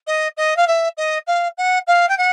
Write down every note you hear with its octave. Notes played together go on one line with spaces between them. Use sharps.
D#5
D#5
F5
E5
D#5
F5
F#5
F5
G5
F#5